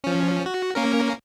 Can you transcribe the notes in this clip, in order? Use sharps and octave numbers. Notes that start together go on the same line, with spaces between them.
F3 C#4
F#4
A#3 C#4 A#4